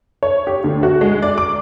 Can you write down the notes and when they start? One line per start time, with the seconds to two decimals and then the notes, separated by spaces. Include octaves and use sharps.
0.23 C#5
0.47 G4
0.64 D2
0.83 F#4
1.01 G#3
1.22 D5
1.38 D6